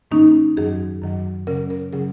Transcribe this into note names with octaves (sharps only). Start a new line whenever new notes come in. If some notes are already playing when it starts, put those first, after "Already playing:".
G#2 D#3 A#3 C#4 D#4
F#2 D#3 F#3 G#4
F#2 D#3 F#3
C#3 F#3 C#4 A#4
A#4
C#3 F#3 C#4 G#4